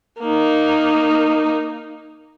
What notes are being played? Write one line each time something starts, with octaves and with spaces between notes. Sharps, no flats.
A#3 D#4